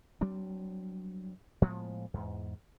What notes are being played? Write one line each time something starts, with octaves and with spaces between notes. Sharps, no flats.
F#3 G3 C4 D4
A2 F3 G#3 B3
E2 G#2